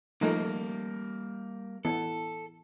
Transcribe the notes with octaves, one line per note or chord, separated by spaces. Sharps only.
F3 G3 A3 A#3 D#4
E3 B3 E4 A4